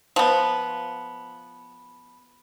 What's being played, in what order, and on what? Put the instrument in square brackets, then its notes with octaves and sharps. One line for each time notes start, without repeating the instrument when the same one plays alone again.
[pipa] F3 B3